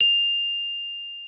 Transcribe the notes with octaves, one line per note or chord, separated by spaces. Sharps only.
F7